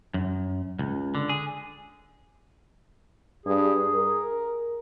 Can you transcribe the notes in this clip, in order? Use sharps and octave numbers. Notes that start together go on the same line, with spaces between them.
F#2
C#2
D3
G#4
G2 G#4
A#4